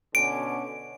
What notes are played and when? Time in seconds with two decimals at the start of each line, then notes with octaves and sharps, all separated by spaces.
0.15 B2 D3 C#4 D7